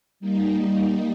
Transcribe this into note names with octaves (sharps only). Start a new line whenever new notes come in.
G3 A#3 D#4